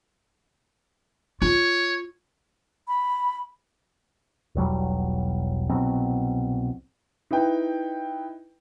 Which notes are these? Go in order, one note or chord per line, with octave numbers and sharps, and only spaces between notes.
F4 C#5
B5
E1 B1 F#3 G3
C2 B2 F#3 C4
D#4 E4 B4 G5